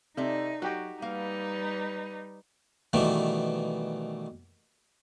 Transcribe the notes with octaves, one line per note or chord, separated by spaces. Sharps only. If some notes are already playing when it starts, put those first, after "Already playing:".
C3 D#4 A4 D5 E5
F#3 F#4 G4 G5
G3 A#3 D#4 B4 F5
B2 D#3 E3 G3 A3